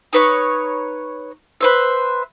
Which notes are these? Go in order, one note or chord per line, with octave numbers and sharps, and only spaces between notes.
D#4 B4 C#5
B4 C5 E5